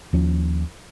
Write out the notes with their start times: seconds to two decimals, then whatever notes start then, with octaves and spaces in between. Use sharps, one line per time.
0.13 D#2 F3 C#4